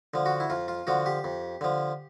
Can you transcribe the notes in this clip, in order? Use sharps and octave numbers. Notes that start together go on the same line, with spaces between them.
D3 F3
F#4
E4
F2 F4
F4
D3 F3 F#4
G4
F2
D3 F3